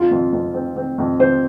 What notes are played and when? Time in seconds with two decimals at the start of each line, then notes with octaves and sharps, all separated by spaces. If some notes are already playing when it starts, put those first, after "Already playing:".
Already playing: F2 F4
0.11 F2
0.33 F2
0.54 C4
0.76 C4
0.98 F2
1.19 C4 C5